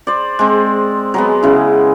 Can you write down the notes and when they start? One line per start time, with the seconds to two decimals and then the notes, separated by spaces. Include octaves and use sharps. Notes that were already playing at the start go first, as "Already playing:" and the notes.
0.07 C5 D5
0.39 G#3 C4
1.14 F#3 G#3 B3
1.43 C#3 E4